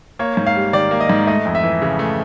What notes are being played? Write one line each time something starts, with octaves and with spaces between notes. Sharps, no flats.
A#3 C#5
G#2
F5
G3
D#3 D5
A#3
D#5
G#2
A3 D#5
F2
E5
E3
C#3
A3